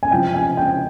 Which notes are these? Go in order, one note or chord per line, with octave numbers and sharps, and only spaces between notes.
G#5
C3 F3 G5
G#5
G5